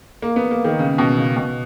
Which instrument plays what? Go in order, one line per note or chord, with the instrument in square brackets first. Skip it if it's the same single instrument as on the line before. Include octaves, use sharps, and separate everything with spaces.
[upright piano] A#3
B3
A#3
D#3
C#3
B2
C#3
B2